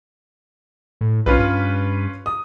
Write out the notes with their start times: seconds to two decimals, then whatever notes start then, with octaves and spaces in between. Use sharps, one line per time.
1.01 A2
1.26 B1 C#4 F4 B4
1.38 G2
2.26 D#6